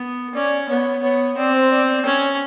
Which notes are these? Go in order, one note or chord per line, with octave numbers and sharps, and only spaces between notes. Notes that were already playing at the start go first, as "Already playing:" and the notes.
Already playing: B3
C#4 D5
B3 C#5
B3 C#5
C4 D5
C5
D5
D5
C#4 C#5